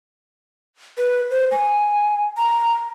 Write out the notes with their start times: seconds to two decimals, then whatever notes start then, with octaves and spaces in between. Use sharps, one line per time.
0.98 B4
1.31 C5
1.51 G#5
2.37 A#5